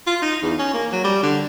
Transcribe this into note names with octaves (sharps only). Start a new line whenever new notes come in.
F4
D#4
E2
C#4
A#3
F#3
G3
D3